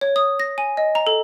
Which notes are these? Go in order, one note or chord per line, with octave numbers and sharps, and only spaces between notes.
C#5
D#6
A#6
G#5
D#5
A#5
A4